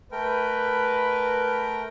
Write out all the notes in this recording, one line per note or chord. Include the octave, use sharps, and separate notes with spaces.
A3 A#4 B4 G5